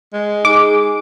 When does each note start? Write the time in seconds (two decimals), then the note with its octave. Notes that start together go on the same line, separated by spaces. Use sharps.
0.13 G#3
0.45 D#4 G#4 D6